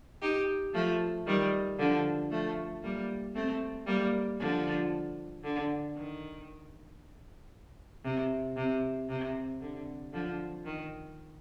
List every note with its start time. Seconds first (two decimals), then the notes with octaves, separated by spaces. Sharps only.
0.22 D#4 G4
0.74 F3 A3
1.27 D#3 G3
1.79 D3 F3
2.31 F3 A3
2.83 G3 A#3
3.35 A3 C4
3.87 G3 A#3
4.40 D3 F3
5.44 D3
5.96 D#3
8.04 C3
8.57 C3
9.09 C3
9.61 D3
10.13 D3 F3
10.65 D#3